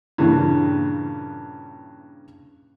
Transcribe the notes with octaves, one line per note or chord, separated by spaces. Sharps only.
G2 A#2 C#3 E3